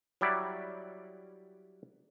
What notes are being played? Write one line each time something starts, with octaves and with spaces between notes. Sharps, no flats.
F#3 G3 E4 D5